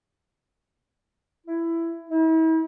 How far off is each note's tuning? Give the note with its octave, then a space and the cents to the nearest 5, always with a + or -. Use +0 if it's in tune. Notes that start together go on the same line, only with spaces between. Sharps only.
E4 +15
E4 -40